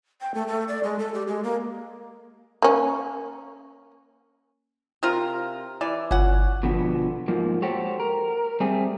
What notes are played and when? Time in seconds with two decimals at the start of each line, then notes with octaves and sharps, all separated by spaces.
0.21 G5
0.34 A3
0.48 A3
0.68 D5
0.84 G#3
0.99 A4
1.14 G4
1.28 G#3
1.43 A#3
2.62 A#3 C#4
5.03 C3 F4 A#4
5.81 E3 D5
6.11 G1 C#4 F#5
6.63 B2 D3 F3 B3
7.28 G#2 F3 A#3 F#4
7.62 F#4 G4 A4 C5 C#5
8.00 A#4
8.60 G3 A3 C4 G#4